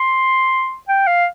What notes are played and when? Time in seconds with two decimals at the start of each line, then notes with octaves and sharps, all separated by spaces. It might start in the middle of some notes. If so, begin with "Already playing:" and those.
Already playing: C6
0.89 G5
1.07 F5